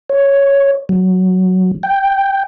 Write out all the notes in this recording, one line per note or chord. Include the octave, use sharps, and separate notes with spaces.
C#5
F#3
G5